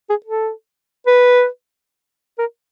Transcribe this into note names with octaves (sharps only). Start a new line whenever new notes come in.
G#4
A4
B4
A#4